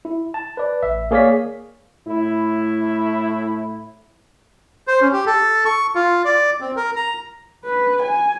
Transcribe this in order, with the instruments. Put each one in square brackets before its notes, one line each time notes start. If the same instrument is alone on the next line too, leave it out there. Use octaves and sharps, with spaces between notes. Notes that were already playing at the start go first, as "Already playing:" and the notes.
[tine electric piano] E4
A5
B4 D5
A1 E5
A#3 G#4 C#5 D5 F5 B6
[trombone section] A2 E4
[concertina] C5
C#4
G4
A4
C#6
F4
D5
C4
A#4
A#5
[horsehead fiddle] B4
G#5